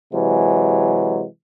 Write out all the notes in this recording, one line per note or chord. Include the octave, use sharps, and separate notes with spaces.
C3 E3 F#3 G#3